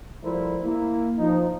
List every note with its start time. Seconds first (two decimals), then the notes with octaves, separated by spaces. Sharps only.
0.23 F3 G3 A3 E4 A#4 C5
0.63 A#3 E4
1.18 F3 D#4